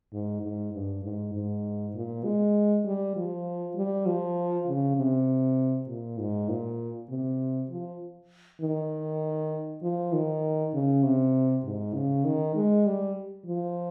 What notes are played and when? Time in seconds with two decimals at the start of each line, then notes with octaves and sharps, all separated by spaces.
0.12 G#2
0.42 G#2
0.73 G2
1.04 G#2
1.33 G#2
1.95 A#2
2.24 G#3
2.85 G3
3.16 F3
3.76 G3
4.06 F3
4.67 C#3
4.97 C3
5.88 A#2
6.18 G#2
6.49 A#2
7.10 C3
7.70 F3
8.61 D#3
9.82 F3
10.13 D#3
10.73 C#3
11.03 C3
11.65 G#2
11.95 C#3
12.24 D#3
12.55 G#3
12.86 G3
13.46 F3